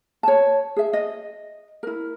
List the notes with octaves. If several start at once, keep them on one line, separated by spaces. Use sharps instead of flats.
C#5 A5
G#4 E5
D#5
E4 A#4